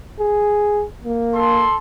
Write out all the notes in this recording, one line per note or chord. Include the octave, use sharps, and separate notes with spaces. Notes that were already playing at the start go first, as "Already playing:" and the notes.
G#4
A#3
A4 C6